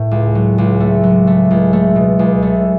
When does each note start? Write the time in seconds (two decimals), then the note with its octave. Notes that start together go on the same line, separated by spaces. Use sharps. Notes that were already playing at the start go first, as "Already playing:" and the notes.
Already playing: A2
0.11 C#2
0.35 F#3
0.58 C#2
0.80 A3
1.03 F#3
1.27 A3
1.51 C#2
1.73 A3
1.96 B2
2.19 C#2
2.43 A3